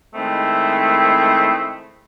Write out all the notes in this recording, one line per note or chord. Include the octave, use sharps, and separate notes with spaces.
D#3 G#3 A3 C4 E4